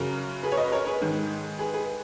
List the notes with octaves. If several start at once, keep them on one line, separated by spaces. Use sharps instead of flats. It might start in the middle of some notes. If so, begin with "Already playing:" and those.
Already playing: F#2 C#3 F#3 A#4
G#4 B4
C#5
B4 D#5
A#4 C#5
G#4 B4
G#2 D#3 G#3
G#4 B4
G#4 B4